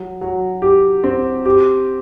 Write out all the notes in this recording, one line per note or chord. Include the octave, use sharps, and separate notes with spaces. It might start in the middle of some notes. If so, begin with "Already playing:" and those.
Already playing: F#3
F#3
G4
C4
G4